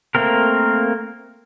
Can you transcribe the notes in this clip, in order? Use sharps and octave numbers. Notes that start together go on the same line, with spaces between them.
A3 A#3 C4 A#4